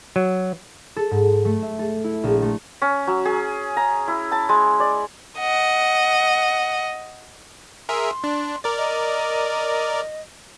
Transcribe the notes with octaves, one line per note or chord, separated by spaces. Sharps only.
F#3
A4
G#2
A3
E5
A4
E4
A#1
A3
C#4
F#3
G#4
A#5
E4
A5
G#3
D5
D#5 F#5
G#4 A#4 E5 C6
D4
A#4 D5
D#5